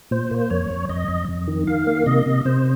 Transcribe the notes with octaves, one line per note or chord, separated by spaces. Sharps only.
A#2 C5
A#3
C5
F2 C#5
F2
F2 D#5
F2
F2
D#3
D#3 F5
A#3
C3 D#5
C3
C3 C5